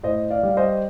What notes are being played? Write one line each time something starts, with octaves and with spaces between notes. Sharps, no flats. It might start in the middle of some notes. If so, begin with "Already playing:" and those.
A2 C5 D#5
D5 F5
G3
F5
C5 D#5